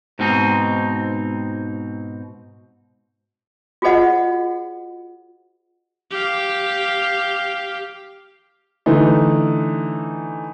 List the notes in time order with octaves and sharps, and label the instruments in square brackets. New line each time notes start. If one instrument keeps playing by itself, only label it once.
[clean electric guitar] G#2 B2 C4 D#4
[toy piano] F4 F#4 G#4 C5 D#5 F#5
[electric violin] G4 F5
[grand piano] D3 E3 A3 D#4